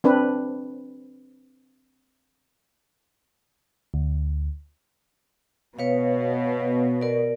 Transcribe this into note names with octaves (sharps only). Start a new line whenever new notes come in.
C4 D4 B4
D2
B2 B4 C#5 F5
A#4 D5